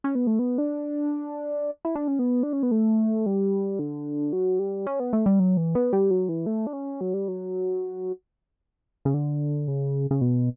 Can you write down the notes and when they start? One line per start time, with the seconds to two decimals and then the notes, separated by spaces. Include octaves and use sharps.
0.04 C#4
0.15 B3
0.27 A3
0.39 B3
0.58 D4
1.85 E4
1.95 D4
2.08 C#4
2.19 B3
2.43 D4
2.53 C#4
2.63 B3
2.71 A3
3.26 G3
3.79 D3
4.33 F#3
4.59 G3
4.87 C#4
5.00 B3
5.13 A3
5.26 G3
5.40 F#3
5.57 E3
5.75 B3
5.93 G3
6.11 F#3
6.29 E3
6.46 A3
6.67 D4
6.73 C#4
7.01 F#3
7.14 G3
7.28 F#3
9.05 C#3
9.14 D3
9.68 C#3
10.11 C#3
10.21 B2